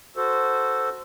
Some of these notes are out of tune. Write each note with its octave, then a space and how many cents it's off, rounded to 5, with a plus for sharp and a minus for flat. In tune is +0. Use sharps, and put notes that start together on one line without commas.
F#4 +0 A4 +0 C5 -10